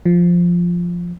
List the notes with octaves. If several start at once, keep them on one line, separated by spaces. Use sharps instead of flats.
F3